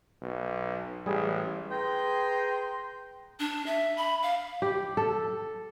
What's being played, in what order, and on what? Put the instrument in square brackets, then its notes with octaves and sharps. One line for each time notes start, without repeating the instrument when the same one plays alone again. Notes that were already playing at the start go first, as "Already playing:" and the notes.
[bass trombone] B1
[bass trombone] A1 [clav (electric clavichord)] G3 G#4
[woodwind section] G#4 B4 G5 A#5 C6
[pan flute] D4
E5
B5
F5
[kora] G4
A4